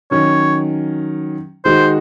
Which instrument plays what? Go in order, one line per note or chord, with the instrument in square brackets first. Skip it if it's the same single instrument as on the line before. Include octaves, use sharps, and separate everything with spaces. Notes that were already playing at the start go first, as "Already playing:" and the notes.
[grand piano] D#3 F#3 C#4 [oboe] C#5
[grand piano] D#3 G#3 D#4 F#4 [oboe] C5